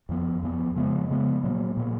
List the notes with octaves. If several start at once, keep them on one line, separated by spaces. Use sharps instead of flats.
F2 F3 B3
F2 F3 B3
C#3 F3 G#3 B3
C#3 F3 G#3 B3
A#2 F#3 A#3
A#2 F#3 A#3